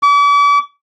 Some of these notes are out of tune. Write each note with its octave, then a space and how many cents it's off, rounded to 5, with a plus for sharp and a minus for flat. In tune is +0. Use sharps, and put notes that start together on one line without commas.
D6 -40